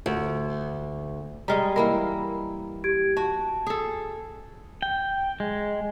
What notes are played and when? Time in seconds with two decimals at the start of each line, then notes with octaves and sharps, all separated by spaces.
0.06 D2
1.48 G3 G#3 D#5 A#5 F6
1.76 E3 A#3 A#4 B5
2.84 G4 G#6 D7
3.17 F#4 A5
3.67 G#4 A4
4.82 G5
5.40 G#3